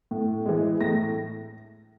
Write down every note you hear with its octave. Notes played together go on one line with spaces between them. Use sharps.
A2
E3 G#3
A2 A#6